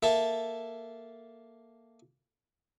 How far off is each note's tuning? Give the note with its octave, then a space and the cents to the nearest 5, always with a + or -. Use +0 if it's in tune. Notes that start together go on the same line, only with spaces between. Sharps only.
A#3 +0 A4 +0 E5 +0